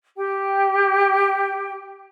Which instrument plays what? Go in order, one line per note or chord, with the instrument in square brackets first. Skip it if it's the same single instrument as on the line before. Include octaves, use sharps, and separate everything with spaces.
[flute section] G4 G5